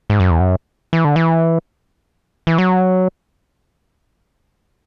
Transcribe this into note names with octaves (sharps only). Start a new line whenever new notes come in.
G#2
F#2
E2
F#2
E3
D3
E3
E3
F#3